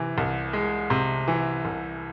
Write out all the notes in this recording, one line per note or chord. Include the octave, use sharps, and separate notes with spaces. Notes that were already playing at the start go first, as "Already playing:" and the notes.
Already playing: C3 E3
C2
G#3
C3
E3
C2